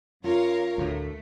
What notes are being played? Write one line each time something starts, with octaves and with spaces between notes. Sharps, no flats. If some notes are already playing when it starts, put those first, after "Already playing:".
F#2 F4 A#4 C#5 F5
D2 A2 A3